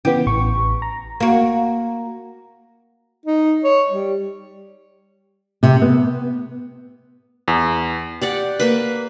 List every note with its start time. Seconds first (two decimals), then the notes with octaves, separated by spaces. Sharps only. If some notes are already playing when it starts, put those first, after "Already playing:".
0.05 C#3 E3 B3 G4
0.27 A1 C#6
0.82 A#5
1.20 A#3 F#4
3.26 D#4
3.64 C#5
3.89 G3
5.63 C3
5.82 B3
7.48 E2
8.22 G4 D5 F#5
8.60 A#3 B4